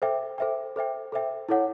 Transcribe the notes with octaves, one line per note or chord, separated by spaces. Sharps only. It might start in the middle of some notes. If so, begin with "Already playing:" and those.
A4 C5 E5 G5
A4 C5 E5 G5
A4 C5 E5 G5
A4 C5 E5 G5
E4 A4 C#5 F#5